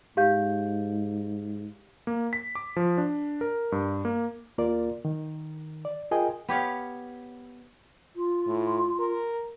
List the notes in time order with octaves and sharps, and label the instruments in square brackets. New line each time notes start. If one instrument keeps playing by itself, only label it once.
[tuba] G#2 [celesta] G4 F5 G6
[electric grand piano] A#3
B6
D6
F3
D4
A#4
G2
A#3
[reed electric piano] D#2 A#3 F4 A#4 D5
D#3
D5
F4 G#4 A#4 D#5 G5 G#5
[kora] B3 G4 C#5 F5
[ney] F4
[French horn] A2
A#4